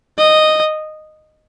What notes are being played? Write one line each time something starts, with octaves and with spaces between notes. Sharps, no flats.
D#5